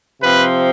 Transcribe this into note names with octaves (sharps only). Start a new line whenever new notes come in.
C3 F3 C4 B4